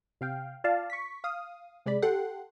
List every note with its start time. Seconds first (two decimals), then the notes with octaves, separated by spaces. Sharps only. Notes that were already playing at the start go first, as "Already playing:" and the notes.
0.21 C3 F5 G5
0.64 F4 D5 F5 A5
0.90 C#6 B6
1.24 F5 D#6
1.86 C3 G#3 D5 B5
2.02 G4 A4 F#5 G5 C6